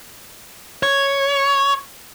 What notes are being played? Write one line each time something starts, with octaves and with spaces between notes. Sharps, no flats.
C#5